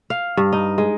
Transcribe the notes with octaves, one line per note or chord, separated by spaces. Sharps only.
F5
G2
D#4
G#3